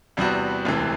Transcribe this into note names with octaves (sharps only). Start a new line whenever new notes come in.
E2 C3 G3 B3 F#4
E1 D2 C3 E3